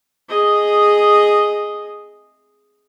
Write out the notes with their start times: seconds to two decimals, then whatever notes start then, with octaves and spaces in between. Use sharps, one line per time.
0.29 G#4 D#5